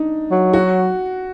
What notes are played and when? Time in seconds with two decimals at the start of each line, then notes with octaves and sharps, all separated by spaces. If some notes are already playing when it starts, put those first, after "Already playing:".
Already playing: D4 D#4
0.31 F#3
0.53 F#4